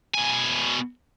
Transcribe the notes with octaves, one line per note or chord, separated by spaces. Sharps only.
B2 G#5